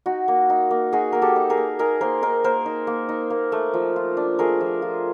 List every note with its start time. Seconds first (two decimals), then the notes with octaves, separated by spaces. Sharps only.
0.06 D#4 F#4
0.28 A#3
0.50 D#4
0.71 A#3
0.92 D#4 F#4 G#4
1.12 A#3 A#4
1.22 G4 A4
1.36 D#4
1.50 G#4 A#4
1.57 A#3
1.79 D#4 G#4 A#4
2.01 A#3 A#4 C5
2.22 D#4 A#4 C5
2.44 A#3 A#4 C5
2.66 D#4
2.87 A#3
3.09 D#4
3.30 A#3
3.52 A3
3.74 F3
3.96 F4
4.17 D4
4.39 A3 G#4 A#4
4.60 F3
4.82 F4